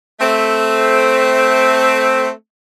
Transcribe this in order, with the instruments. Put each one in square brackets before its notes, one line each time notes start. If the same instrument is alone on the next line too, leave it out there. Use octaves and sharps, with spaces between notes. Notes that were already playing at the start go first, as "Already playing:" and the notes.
[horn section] A3 C4